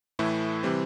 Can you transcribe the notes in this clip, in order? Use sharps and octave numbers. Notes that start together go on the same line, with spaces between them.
A2 E3 A3 E4
C3 E3 G3 C4